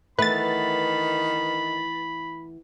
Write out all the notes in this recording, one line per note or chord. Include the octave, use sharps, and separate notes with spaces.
D#3 E3 A3 B3 B4 B5 A6